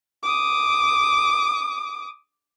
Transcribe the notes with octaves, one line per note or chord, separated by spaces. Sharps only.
D6 D#6